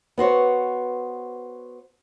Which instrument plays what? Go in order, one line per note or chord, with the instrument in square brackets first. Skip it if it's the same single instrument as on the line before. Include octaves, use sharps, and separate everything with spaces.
[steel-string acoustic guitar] B3 F#4 C5 C#5